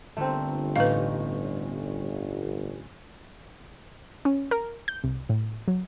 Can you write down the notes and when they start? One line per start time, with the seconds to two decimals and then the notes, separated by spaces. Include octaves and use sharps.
0.17 G1 D3 A3 A#3 C4
0.76 A1 C#4 D#4 B4 F5 G6
4.25 C#4
4.51 A#4
4.88 G6
5.04 C2
5.29 A2
5.68 F#3